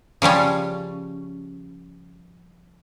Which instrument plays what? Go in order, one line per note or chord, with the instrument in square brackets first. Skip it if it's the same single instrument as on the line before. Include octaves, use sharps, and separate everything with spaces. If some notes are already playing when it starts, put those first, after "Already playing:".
[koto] C#3 F3 G3 C#4